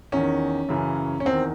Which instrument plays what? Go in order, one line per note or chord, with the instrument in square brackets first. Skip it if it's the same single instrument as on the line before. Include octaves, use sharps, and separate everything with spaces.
[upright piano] E2 D#3 C#4
F#2 C#3 E3
C#4
E2 D#3 C4